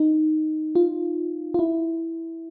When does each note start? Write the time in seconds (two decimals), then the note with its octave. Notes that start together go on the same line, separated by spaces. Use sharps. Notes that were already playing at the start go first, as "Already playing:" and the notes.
Already playing: D#4
0.75 F4
1.54 F4
1.59 E4